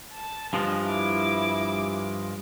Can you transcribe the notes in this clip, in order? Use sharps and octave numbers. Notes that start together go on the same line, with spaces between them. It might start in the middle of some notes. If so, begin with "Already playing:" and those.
A5
G2 F3 G#3
E4 D6